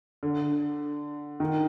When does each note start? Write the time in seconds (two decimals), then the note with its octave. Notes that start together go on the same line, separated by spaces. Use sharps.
0.23 D3
1.40 D#3